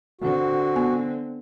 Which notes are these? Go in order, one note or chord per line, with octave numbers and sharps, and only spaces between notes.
D3 C4 F#4
B3 G#5